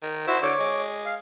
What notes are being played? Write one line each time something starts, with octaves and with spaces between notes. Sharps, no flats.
D#3
E4 F#4 C5
D3 C#5 D6
G#3
F5